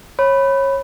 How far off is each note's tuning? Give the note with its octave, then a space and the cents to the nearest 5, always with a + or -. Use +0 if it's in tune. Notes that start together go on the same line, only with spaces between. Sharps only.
C#5 -25 B5 +0